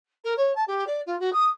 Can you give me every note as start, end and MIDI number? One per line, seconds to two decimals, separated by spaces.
0.24 0.33 70
0.37 0.52 73
0.55 0.63 81
0.67 0.84 67
0.87 1.01 74
1.06 1.18 65
1.19 1.32 66
1.32 1.48 87